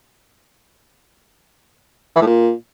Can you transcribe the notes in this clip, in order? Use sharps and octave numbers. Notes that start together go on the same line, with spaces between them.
E3
A2
A#2